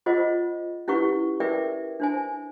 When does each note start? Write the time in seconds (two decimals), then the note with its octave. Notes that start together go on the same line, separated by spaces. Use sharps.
0.06 F4 G#4 C5 D#5 F#5
0.88 C#4 E4 G4 B4 F#5 C#6
1.40 G#4 A#4 B4 D5 E5 G5
2.00 D4 C5 G#5